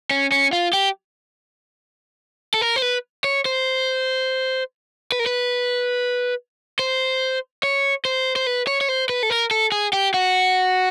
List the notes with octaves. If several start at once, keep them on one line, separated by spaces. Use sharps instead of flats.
C#4
C#4
F4
G4
A4
A#4
C5
B4
C#5
C5
B4
A#4
B4
C5
C#5
C5
C5
B4
C#5
C#5
C5
B4
A4
A#4
A4
G#4
G4
F#4